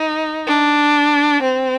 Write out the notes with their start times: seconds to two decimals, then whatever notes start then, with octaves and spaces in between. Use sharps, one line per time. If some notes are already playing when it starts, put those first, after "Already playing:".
Already playing: D#4
0.47 D4
1.42 C4